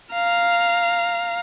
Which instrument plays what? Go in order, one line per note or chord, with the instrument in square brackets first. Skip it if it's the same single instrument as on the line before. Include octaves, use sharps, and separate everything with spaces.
[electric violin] F5 A#5